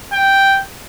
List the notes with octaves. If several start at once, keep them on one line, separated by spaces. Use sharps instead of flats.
G5